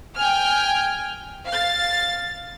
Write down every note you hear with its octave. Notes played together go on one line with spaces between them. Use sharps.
G5 G#5 F6
F5 A6